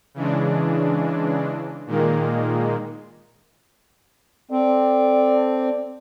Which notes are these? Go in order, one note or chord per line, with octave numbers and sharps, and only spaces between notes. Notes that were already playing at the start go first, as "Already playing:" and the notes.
C#3 E3 G#3 D4
A#2 D#3 G#3 A#3
C4 A4 D5